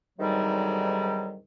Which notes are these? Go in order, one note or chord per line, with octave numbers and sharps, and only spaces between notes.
D2 G#2 C3 D#3 F#3 G3